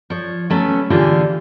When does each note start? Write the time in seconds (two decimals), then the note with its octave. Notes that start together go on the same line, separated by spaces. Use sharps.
0.10 F3 C#5
0.50 F#3 A3 B3 C#4
0.90 A#2 D3 E3 F4 G4 G#4